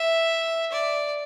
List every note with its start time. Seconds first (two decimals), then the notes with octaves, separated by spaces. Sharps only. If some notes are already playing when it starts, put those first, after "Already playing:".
Already playing: E5
0.72 D5